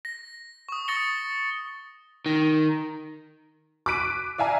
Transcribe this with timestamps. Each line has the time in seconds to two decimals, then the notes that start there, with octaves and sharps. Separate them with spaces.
0.05 A#6
0.69 C#6 D#6
0.88 C#6 D#6 A6 A#6 C#7 G7
2.26 D#3
3.86 D6 F#6 B6 D7 D#7
4.38 D5 E5 F5 G#5 A#5